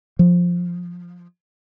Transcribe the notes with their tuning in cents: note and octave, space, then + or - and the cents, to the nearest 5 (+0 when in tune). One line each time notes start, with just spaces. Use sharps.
F3 +10